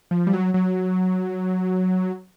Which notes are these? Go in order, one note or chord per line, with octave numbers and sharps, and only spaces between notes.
F3
G3
F#3
F#3